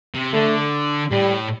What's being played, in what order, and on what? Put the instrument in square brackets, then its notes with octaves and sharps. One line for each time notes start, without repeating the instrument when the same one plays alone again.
[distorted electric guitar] C3
[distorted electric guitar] D3 [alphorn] A3
[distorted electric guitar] A2 [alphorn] G3